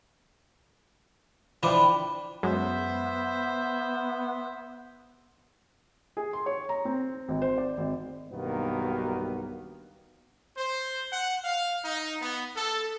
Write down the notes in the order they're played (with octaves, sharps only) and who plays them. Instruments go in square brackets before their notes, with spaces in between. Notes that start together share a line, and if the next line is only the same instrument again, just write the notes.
[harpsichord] E3 F3 D4 [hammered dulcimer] G5 B5
[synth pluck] F#2 G#3 [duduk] B3 [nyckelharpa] C5 E5
[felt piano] G#4
C6
C#5
A#5
C4
G#1
C5
D5
G#1
[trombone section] B1 G2 B2 D#3 A#3 B3
[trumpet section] C5
F#5
F5
D#4
B3
A4